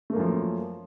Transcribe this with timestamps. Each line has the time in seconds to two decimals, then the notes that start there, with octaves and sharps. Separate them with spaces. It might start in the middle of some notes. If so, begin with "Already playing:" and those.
0.10 A3
0.13 A#3
0.16 F#2
0.20 F3